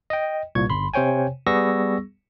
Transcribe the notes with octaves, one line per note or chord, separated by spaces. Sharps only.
D#5 G5
C2 A#2 C#6 G#6
G1 B5 C6
C3 C5 C#5 G5 G#5
G3 B3 G#4 C#6 E6 A#6